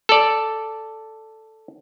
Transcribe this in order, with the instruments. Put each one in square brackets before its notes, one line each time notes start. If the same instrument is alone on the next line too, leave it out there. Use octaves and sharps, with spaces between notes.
[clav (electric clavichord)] A4 D5